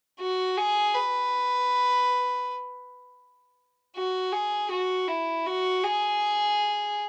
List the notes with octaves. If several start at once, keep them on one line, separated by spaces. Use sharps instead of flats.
F#4
G#4
B4
F#4
G#4
F#4
E4
F#4
G#4